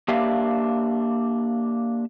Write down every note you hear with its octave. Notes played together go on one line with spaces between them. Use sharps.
A#3 D4 G4 E5 F5